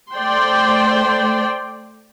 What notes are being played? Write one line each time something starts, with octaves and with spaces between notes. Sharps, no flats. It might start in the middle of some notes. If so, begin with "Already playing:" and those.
A3 C5 D5 G5 C6